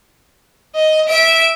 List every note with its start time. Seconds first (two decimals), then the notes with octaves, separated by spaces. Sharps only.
0.75 D#5
1.08 E5 D7